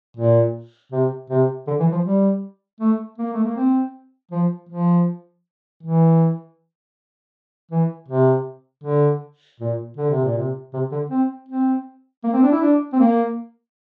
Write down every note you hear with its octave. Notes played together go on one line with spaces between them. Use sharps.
A#2
C3
C3
D3
E3
F3
G3
A3
A#3
A3
A#3
C4
F3
F3
E3
E3
C3
D3
A#2
D3
C3
A#2
C3
C3
D3
C4
C4
A#3
C4
D4
E4
D4
C4
A#3